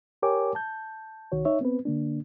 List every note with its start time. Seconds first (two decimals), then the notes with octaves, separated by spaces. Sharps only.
0.22 G4 A#4 C#5 G5 G#5 D6
0.55 A5 G6
1.32 C2 D#3 F#4 C#5
1.45 D#4 C#5 E5
1.61 B3 C4 B4
1.85 D3 A#3 D4